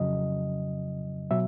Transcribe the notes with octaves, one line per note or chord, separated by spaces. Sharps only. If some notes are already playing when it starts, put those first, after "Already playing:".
Already playing: F2 C#3 F#3 D#5
B2 F#3 E5